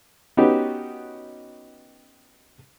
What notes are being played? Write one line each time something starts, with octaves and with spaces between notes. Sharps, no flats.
B3 C#4 D#4 F#4 G4 B4